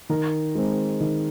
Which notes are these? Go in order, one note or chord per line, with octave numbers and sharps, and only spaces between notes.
D#3 A#4
G#3 C4
D#3